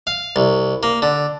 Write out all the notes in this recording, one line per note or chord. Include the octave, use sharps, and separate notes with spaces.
F5
C2
A#3
D3